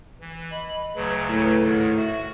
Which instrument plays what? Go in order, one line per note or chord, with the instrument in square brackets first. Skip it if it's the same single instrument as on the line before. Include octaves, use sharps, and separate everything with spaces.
[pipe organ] E3
[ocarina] D#5 [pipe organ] B5
[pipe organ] D2 C#3 F#3 [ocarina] B4
[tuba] A2
[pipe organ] G#2 D#3
[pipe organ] F#4 [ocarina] E5